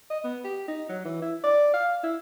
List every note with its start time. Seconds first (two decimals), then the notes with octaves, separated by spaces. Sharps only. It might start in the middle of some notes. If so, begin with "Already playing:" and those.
0.10 D#5
0.24 B3
0.44 G4
0.68 D#4
0.89 F#3
1.05 E3
1.22 E4
1.43 D5
1.73 F5
2.03 E4